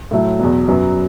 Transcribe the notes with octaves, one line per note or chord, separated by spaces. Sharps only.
A2 F#3 A3 E4
E2 B2 F#3
F#2 F#3 B3